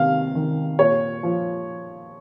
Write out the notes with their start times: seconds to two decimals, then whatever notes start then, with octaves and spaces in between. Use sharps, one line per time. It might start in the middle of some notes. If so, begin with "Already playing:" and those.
Already playing: C3 D#3 F5
0.35 D#3
0.79 A#2 C#5
1.23 F3